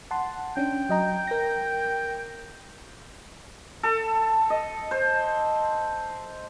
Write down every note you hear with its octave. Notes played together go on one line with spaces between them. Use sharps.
F#5 A5 C6
C#4 D4 G5
F#3 D#5 A#5
A#4 A#6
A4
D#5
C5